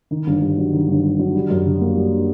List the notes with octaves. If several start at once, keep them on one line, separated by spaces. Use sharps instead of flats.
D#3
G1
G2
F#3
D#3
G1
G2
F#3
G3
F#2
D3
A#3
G3